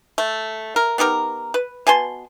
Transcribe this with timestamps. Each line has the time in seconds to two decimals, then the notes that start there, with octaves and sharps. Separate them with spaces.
0.18 A3
0.76 A#4
0.98 B3 D#4 G4 A#4
1.54 B4
1.87 B2 G#5 A5 C6